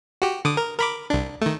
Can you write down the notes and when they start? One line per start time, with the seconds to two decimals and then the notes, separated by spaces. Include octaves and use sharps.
0.22 F#4 G4
0.45 D3 D6 D#6
0.57 A#4
0.79 A#4 B5 D6
1.10 C2 D4
1.41 D#3 A3